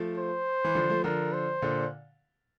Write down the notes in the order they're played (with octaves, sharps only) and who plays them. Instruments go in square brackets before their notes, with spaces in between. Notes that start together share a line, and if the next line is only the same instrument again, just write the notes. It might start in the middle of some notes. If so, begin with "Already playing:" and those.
Already playing: [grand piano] F3 A3
[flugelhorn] C5
[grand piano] E3
D3 F3
F3 A3
[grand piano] D3 F3 [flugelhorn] A#4
[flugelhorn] C5
[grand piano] A#2 D3